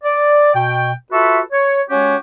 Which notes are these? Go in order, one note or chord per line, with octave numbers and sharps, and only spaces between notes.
D5
B2 G5
F4 F#4 A4 B4 E5
C#5
G#3 C#4 F#4 G4 C#5